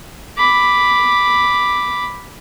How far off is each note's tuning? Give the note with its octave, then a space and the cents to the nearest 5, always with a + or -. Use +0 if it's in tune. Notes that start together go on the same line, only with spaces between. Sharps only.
B5 +0 D6 +0